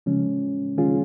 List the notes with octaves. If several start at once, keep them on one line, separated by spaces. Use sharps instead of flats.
C#3 F3 G#3 C#4
D#3 G#3 C#4 F4 G#4